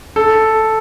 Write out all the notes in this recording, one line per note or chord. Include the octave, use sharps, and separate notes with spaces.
A4